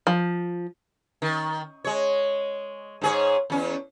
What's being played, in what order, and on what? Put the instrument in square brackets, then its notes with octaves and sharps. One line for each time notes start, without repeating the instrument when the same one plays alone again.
[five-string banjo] F3
[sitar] D#3
G#3 C#5
G#2 G#4 C#5
E2 C#4